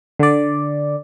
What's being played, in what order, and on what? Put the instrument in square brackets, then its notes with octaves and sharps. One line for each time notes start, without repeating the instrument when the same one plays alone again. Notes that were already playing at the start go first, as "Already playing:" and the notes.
[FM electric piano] D3 D5